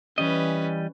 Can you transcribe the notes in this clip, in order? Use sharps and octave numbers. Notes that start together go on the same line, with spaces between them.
E3 G3 C#4 B4 D#5